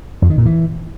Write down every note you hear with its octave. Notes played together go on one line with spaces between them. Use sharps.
F2
D#3
A#2
E3